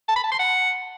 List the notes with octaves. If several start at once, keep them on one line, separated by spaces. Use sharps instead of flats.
A5
B5
A5
C6
F#5